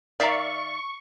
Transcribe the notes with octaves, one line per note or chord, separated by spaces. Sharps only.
D#3 D5 E5 F5 A#5 C#6